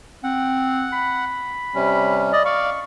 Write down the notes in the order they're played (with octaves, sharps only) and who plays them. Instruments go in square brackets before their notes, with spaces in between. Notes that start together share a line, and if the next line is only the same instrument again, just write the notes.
[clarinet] C4 [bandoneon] F#5
[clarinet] B5
[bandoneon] C3 G3 C#4
[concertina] D5 D#5
[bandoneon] D5 F5 [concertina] C#6